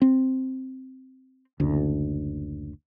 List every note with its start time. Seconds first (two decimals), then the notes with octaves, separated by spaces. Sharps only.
0.02 C4
1.60 F#1 D2